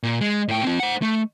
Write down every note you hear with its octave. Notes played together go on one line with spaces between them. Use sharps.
A#2
G#3
A2 G5
C4 F4
C5 F#5
A3